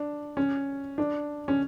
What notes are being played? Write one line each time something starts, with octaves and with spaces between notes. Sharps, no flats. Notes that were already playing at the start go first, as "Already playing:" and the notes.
Already playing: D4
C#4
D4
C#4